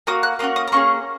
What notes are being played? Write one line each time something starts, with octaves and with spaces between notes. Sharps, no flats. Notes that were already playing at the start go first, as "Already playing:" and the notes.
A#3 F#4 D#6
F#6
A#3 C#4 F#4 D#6
D#6
A#5
A#3 C#4 G#4 C#6